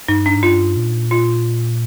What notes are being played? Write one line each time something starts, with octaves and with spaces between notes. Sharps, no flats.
G2 D#4
D4
G#2
G2 F4
A#2
F4